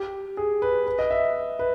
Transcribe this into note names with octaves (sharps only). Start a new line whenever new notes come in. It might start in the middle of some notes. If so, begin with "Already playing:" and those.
Already playing: G4
G#4
B4
B4
D#5
E5
B4